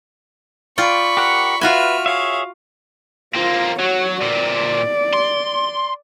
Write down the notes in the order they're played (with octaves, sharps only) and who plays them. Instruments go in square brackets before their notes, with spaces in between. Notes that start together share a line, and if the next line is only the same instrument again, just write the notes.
[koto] F4 D5 G5 [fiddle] B5 C#6
[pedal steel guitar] G4 A#4 F#5
[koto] F4 F#4 G#5 [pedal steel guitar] B4 [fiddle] E5 F6
[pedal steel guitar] G#4 C#5 E5 [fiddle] F5
[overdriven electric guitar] A#3 C4 [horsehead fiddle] F4 C5
[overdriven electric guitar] F#3 [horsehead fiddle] F#4 C#5
[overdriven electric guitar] A#2 C4 [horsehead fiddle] D5
[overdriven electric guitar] C6